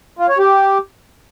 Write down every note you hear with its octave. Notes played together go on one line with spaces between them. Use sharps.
F4
C#5
G4